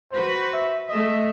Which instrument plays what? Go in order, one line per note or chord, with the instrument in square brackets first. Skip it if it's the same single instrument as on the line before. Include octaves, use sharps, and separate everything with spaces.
[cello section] F#4 B4 [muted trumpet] C5
[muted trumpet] E5
[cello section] A3 E5 [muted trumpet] D#5